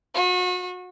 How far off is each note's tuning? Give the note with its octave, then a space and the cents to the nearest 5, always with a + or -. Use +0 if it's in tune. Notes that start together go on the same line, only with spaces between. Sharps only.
F#4 -35